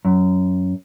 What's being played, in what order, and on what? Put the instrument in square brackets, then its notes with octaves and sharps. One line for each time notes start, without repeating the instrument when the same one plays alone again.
[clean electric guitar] F#2